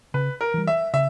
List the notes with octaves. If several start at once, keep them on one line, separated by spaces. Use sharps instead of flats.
C#3 B4
A#4
E3 G3
E5
C#3 E5